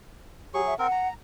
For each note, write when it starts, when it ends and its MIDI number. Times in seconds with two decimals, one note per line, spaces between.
0.54 0.74 54
0.54 0.62 67
0.54 0.74 68
0.54 0.74 85
0.67 0.78 76
0.79 0.87 60
0.79 0.87 70
0.79 1.08 78
0.92 1.14 82